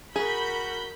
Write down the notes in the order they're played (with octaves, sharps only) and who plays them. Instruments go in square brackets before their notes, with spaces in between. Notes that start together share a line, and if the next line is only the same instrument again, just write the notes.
[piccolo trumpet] F#4 [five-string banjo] G#4 [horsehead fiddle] A#4 [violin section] B5 G6